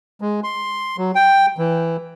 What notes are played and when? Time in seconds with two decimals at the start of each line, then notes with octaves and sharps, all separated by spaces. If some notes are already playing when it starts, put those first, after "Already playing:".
0.21 G#3
0.44 C6
0.98 F#3
1.15 G5
1.58 E3